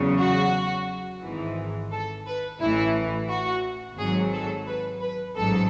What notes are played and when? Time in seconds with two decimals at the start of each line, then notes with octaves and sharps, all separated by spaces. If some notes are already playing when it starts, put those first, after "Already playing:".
Already playing: E2 C#3 F#3
0.19 F#4
1.22 G#1 G#2 E3
1.91 A4
2.26 B4
2.60 A1 A2 E3 E4
3.29 F#4
3.98 G#1 G#2 F#3 G#4
4.33 A4
4.67 B4
5.02 B4
5.36 A1 G#2 F#3 A4